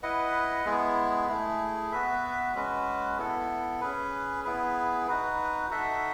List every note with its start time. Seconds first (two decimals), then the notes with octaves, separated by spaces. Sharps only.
0.03 E4 B4 D#5 F#5
0.65 G#3 B3 E4 G#4
1.29 A3 E4 G#4
1.92 B3 F#4 B4 E5
2.54 G#3 C#4 F#4 B4
3.17 B3 E4 A4
3.81 C#4 G#4 B4
4.45 B3 E4 G#4 B4
5.07 D#4 F#4 B4
5.70 D#4 F#4 A4 E5